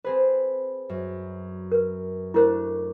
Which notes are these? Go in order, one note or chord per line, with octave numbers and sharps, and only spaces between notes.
C4 G#4 B4 C5
F#2
A#4 B4
A3 D4 E4 A#4 C5